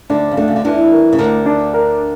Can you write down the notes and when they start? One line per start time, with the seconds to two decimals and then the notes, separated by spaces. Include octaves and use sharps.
0.09 D2 D3 D4
0.32 C#3
0.37 D2 D3 A3
0.48 C#3
0.56 D3
0.65 E2 E3 D4
0.92 A#4
1.13 C#3
1.18 D2 D3 A#4
1.46 D4
1.74 A#4